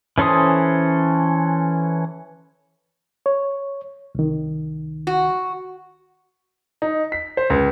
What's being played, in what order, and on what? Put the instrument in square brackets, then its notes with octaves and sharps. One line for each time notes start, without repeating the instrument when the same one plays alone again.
[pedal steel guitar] E3 C#4 A4 C5 D#6
[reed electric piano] C#5
C2 D#3
[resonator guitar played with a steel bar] F#4
[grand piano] D#4
B6
C5
C#2